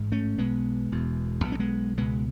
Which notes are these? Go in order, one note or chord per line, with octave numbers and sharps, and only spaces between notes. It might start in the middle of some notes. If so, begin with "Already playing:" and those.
Already playing: A1 G#2
A3 C#4
B1 B2 G#3 B3
E1 E2 B2
B1 A2 B3 C#4
G#3 B3
C#2 B2 G#3 B3